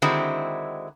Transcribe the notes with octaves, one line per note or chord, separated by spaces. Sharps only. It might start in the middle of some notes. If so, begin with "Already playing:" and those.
D3 D#3 G#3 C4 E4 F#4